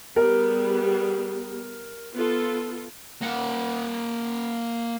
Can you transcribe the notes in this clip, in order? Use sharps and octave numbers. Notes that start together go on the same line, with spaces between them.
G3 B3 G#4 A#4
B3 F4 A4
A#3 F#5